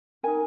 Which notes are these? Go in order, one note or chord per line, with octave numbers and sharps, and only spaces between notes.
D#4 A#4 G#5